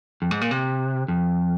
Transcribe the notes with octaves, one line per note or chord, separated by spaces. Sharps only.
F2
G#2
A#2
C3
F2